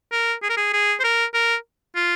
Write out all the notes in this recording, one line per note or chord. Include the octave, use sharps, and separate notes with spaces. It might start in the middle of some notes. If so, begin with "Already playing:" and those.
A#4
G#4
A#4
G#4
G#4
C5
A#4
A#4
F4